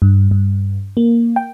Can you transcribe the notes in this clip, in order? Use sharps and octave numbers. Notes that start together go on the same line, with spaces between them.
G2
G2
A#3
G5